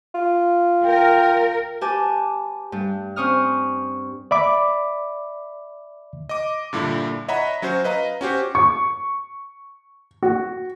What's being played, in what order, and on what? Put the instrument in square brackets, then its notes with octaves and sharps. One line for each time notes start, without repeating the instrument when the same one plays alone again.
[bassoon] F4
[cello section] A#4 [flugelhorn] G5
[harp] G4 B4 G#5 A5 D6
G2
C4 C#4 C#6 D#6 F6
[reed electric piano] D5 E5 B5 D6
[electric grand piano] D#5 D6
G2 A#2 D3 E4
C#5 D#5 E5 F#5 A#5 B5
F#3 C#4 F#4 C5
B4 D#5 F5 A#5
C#4 F#4 G4 C5
[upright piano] C#6
F#4